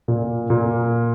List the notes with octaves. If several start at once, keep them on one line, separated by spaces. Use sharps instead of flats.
A#2
A#2